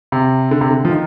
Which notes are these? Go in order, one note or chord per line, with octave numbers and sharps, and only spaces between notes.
C3
D3
C3
D3
F3
D#3